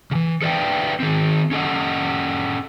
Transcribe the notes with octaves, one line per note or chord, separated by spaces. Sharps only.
C#3 E3
A4 B4 D5 E5 G5
D#3 C4
C#4 A4 D#5 F#5